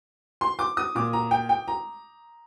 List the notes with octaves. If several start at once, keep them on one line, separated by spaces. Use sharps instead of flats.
C6
D6
D#6
A#2 D6
A#5
G5
G5
A#5